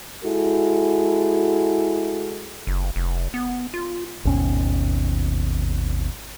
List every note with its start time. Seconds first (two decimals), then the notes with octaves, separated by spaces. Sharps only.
0.25 G#3 E4 F#4 A4
2.67 F#1
2.96 F1
3.34 B3
3.74 F4
4.25 G#1 D#2 B2 C#4